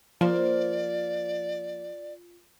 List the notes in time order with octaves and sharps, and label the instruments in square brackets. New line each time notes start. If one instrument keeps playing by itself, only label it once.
[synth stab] F3 [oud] A#3 C5 [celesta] F4 [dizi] D5